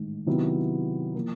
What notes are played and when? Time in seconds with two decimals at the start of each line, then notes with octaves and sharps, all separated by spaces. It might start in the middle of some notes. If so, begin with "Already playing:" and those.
Already playing: A1 G#2 D#3
0.26 C3 D#3 F#3 B3 E4
1.15 F3 A#3